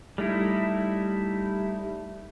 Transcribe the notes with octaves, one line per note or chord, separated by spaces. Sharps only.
G3 A3 D#4 E4